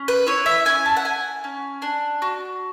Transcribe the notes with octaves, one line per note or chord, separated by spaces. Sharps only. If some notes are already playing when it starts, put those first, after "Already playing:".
Already playing: C#4
B4
E4 C#5
E5
C#4 G#5
A5
F#5
E4 G#5
C#4
D4
F#4